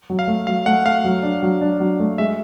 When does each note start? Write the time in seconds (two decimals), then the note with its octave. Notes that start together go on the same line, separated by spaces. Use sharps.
0.10 F#3
0.19 F5
0.27 A3
0.47 F#3 F5
0.66 A3 F#5
0.85 A3 F5
1.04 F#3
1.23 D4
1.43 F#3
1.61 D4
1.80 F#3
2.00 A3
2.18 G#3 E5